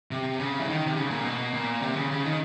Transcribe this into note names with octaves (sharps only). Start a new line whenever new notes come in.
C3
C#3
E3
D#3
C3
C#3
A#2
B2
A#2
C3
C#3
C#3
D#3